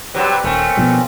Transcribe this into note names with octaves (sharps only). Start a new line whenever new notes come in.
C3 F#3 G3 C4 B4
D#1 A3 A#3 C4 C#4
B2 F3 G3